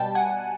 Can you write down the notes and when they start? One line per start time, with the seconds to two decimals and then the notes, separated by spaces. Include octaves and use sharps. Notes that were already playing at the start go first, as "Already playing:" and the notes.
Already playing: B2 G3 G5 A5
0.15 F#5 G#5